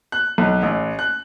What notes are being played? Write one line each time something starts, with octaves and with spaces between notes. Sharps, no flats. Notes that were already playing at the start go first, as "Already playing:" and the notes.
F#6
B1
A1
F#6